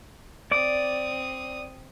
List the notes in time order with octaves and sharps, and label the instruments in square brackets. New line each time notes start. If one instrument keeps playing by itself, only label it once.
[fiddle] C4 D#6 [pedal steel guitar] D5 D6